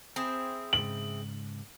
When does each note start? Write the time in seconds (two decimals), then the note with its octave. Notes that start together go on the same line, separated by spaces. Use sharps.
0.16 C4 E4 G#4
0.73 G#2 C#3 F#7